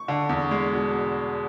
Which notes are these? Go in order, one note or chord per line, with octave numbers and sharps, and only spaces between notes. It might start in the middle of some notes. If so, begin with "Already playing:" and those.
Already playing: C#6
D3
E2
G#3
B2